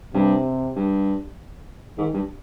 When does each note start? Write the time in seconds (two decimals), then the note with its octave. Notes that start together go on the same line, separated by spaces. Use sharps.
0.14 G2 C3
0.76 G2
1.98 G#2 D#3
2.14 G2